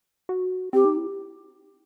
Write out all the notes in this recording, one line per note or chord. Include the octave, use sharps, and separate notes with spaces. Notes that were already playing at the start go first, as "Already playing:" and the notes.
F#4
C4 G4
D#4
E4